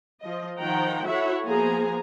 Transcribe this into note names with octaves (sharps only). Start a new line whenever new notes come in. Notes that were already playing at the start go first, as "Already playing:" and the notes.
F3 D#5
D#3 F3 F#5 G5 A#5
E4 F#4 A4 C#5 E5 F#5
F3 A#3 B3 G#4 G#5 A#5